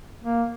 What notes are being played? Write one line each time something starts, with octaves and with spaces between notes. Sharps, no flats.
A#3